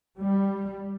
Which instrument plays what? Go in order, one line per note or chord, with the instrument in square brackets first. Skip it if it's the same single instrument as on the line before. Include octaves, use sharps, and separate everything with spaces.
[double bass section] G3